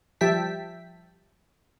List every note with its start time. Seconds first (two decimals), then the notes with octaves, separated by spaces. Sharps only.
0.21 F3 G3 E5 G5 A5 B6